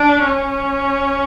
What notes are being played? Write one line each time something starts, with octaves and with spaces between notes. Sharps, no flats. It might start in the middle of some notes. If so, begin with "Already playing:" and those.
Already playing: D4
C#4